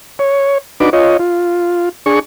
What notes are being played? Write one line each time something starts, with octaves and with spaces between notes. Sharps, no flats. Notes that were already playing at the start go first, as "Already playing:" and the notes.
C#5
D4 D#4 F#4 B4 D6
F4 C#5 D#5
F4
D4 G#4 C#6